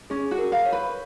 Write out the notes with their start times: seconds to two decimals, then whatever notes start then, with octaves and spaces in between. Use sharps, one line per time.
0.10 C#4 G#4
0.31 F#4
0.38 A#4
0.52 F5
0.66 C#5
0.72 B4